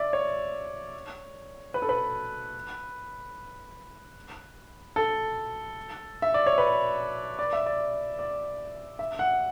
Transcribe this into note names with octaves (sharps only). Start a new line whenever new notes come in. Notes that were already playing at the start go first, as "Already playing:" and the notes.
Already playing: D5 E5
C#5
B4
A4
B4
A4
E5
D5
C#5
B4
D5
E5
D5
D5
E5
F#5